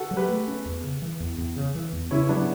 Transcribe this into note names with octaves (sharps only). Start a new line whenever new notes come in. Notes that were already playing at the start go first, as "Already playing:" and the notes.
Already playing: F#4 A4
F#3
G4 B4
A3
C#4
E2
C#3
E3
E2
E2
C#3
E3
E2
C#3 C#4 E4
F#3 B3 D4